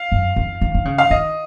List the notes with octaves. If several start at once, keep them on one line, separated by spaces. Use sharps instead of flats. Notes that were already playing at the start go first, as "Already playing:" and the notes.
Already playing: F5
F#2
F2
D#3
D#3
C#3
F5
D#3 D#5